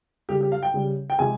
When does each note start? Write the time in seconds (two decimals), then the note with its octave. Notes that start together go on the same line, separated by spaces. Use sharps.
0.29 C#3 G3 G4
0.41 G4
0.52 F5
0.63 G5
0.74 C#3 G3
1.10 G5
1.19 C3 F3 G#3 G#5